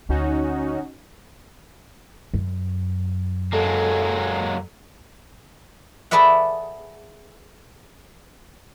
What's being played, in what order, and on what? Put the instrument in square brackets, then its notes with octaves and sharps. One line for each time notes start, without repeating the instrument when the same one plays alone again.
[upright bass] D2 [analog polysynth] C#4 D#4 F#4
[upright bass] F#2
[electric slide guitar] F#3 G#3 A#3 [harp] A4
[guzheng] G#4 A4 B4 D5 E5 F#5